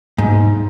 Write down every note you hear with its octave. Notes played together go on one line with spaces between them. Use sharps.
G#2